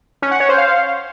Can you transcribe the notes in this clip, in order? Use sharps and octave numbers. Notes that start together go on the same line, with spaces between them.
C#4
F#5
C#5
C5
F5